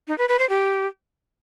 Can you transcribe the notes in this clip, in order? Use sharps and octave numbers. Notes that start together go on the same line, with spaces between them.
D#4
B4
B4
C5
G4